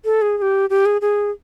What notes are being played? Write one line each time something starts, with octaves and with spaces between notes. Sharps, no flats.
A4
G#4
G#4
G4
G4
G#4
G#4